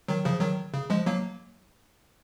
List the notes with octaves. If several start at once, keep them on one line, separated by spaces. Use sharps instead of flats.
D#3 F#3
C#3 F3
D#3 F#3
C#3
F3 G#3
F#3 A#3